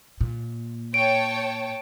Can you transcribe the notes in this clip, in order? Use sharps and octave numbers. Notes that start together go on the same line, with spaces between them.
A#2
C#5 G5 A5 D7